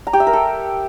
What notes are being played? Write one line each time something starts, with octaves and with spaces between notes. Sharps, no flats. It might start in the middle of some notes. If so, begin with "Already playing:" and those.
A#5
G4
E5
A#4
A4